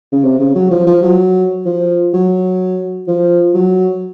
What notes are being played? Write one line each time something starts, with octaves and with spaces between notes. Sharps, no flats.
C#3
C3
C#3
F#3
F3
F3
F#3
F3
F#3
F3
F#3